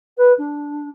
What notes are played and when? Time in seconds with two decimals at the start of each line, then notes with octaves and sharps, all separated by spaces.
0.17 B4
0.38 D4